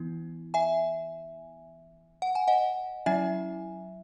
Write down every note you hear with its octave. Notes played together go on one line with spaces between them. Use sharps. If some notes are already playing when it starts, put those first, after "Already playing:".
Already playing: E3 B3 E4
E5 G#5
F#5
G#5
D#5 F#5
F#3 C#4 E4 E5 G#5